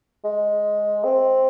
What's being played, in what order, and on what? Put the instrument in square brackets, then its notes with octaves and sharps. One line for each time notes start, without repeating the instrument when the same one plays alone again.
[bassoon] G#3
C4